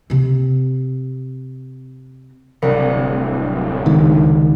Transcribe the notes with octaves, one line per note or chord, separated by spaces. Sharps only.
C3 C4
D1 C2 C#7
C#2 D#3